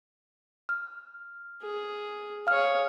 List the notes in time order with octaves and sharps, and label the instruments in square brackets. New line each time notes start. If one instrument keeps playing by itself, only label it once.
[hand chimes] F6
[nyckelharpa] G#4
[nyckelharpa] G#4 C#5 [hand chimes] F5 F6